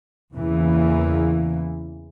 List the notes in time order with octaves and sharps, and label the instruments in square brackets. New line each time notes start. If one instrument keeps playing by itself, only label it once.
[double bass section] E2 C#3 E3 A#3